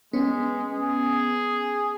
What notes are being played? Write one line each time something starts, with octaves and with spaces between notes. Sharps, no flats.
G#3 B3 C#4
G#4